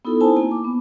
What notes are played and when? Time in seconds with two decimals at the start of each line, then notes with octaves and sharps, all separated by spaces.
0.05 B3 D#4 E4 F#4 A4
0.21 C4 D#4 E4 C5 G#5 A5
0.36 A#3 G#5
0.51 D6
0.65 B3